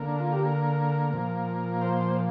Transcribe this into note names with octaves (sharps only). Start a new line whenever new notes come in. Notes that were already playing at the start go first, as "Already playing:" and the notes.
Already playing: D3 A#3 A#4
D4
F4
G4
A#4
A#2 F3 A#3
C5